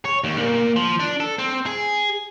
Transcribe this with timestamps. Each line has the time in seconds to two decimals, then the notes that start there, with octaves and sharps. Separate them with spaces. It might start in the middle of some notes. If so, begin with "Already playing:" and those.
0.05 C#5
0.24 D#2
0.38 A#2
0.76 F3
1.00 D4
1.20 A4
1.39 C4
1.66 G#4